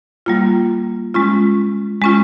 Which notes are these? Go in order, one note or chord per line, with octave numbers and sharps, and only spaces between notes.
G3 A#3 F4
G#3 C#4 F4
G#3 C#4 F4